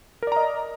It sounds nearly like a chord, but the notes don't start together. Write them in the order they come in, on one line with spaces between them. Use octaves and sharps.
A#4 D5 A#5 D#5